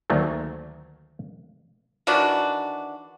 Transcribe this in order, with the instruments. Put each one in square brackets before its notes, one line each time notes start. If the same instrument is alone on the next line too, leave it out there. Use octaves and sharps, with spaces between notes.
[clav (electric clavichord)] D2 D#3 F#3 A3 A#3
[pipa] D#3 E3 D4 F#4